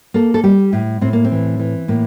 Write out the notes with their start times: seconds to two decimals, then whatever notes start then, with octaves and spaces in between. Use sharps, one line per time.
0.14 A#3 A4
0.34 A4
0.43 G3 G4
0.73 A2
1.01 A2 C4
1.13 A#3
1.24 C4
1.31 E3
1.59 E3
1.88 A2 A#3